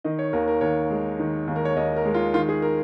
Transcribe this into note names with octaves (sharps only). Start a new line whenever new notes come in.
D#3 D#5
C#5
D#2 A#4
A#4
D#2 C#5
G#3
D#3
D#2
A#4
C#5
D#2 D#5
A#4
G#3
F4
D#3 F4
G#4
A#4